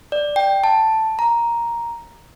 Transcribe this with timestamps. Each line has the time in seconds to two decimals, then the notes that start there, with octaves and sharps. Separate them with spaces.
0.12 D5
0.36 G5
0.64 A5
1.19 A#5